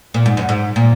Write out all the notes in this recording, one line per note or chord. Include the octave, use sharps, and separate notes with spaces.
A#2
G#2
F#2
G#2
A#2